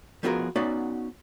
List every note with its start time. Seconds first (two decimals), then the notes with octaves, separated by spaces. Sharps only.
0.23 F3 B3 F4 F#4 G#4 A#4
0.56 B3 C#4 D#4 F#4 D5 F5